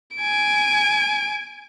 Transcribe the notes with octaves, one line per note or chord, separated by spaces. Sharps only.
G#5 D7